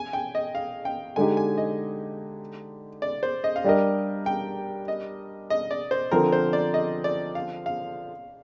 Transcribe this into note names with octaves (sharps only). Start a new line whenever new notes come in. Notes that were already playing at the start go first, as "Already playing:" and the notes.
Already playing: G#5
G5
D#5
F5
G5
D3 G#3 D#4 G4 G#5
G#5
D#5
D5
C5
D#5
F5
G3 D4 G4 A#4 D#5
G5
D#5
D#5
D5
C5
D3 F3 C4 A#4
C5
D5
D#5
D5
F5
F5